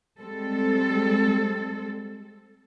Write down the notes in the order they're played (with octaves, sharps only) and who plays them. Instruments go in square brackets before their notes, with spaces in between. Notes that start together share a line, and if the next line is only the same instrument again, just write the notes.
[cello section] G3 G#3 C4 A4